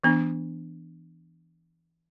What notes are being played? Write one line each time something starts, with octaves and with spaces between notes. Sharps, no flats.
E3 B3 D4